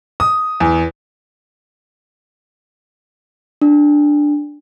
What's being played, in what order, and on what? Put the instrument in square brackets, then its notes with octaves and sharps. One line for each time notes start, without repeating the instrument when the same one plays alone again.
[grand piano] D#6
E2
[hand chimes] D4